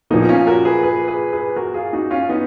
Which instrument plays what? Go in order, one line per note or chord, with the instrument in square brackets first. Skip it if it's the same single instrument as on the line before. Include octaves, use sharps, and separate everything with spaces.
[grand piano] A#2 F3 A#3 [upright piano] B3 D#4
[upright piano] C#4 F4
F#4 A#4
G#4 B4
G#4 B4
G#4 B4
G#4 B4
F#4 A#4
F4 G#4
D#4 F#4
C#4 F4
B3 D#4